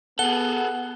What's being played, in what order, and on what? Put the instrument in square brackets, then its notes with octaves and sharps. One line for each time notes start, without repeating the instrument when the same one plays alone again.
[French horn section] B3 [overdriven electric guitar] G#4 A4 [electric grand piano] F#5 [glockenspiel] G7